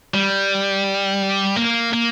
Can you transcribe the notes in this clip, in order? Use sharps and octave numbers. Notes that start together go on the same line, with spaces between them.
G3
A#3
A#3